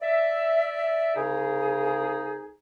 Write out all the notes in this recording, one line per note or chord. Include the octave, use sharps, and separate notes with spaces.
D5 E5
C2 C#3 D#4 G#4